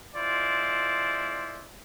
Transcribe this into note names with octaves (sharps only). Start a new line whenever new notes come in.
G#3 E4 F4 C5 D5